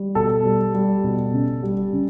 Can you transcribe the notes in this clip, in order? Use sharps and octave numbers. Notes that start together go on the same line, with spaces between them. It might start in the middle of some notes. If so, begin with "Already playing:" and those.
Already playing: G3
B2 A4
G3
G3
B2
C#3
G3
C#3